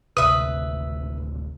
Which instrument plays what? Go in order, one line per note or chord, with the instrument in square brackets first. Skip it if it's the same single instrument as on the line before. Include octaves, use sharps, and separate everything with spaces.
[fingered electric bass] D1 G#1 D2 [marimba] C3 [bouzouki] B4 E5 [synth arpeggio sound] D#6